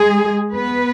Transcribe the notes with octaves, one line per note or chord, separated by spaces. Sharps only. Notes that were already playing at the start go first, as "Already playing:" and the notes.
Already playing: G#3 G#4
B3 B4